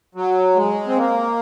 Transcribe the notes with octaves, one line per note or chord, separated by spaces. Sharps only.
F#3
G#3
C4
A#3